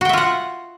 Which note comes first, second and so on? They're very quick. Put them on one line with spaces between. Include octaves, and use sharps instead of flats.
F#4 G5 E5 F4 F#5